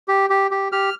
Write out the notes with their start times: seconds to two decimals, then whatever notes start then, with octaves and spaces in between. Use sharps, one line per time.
0.08 G4
0.30 G4
0.51 G4
0.72 G4 F6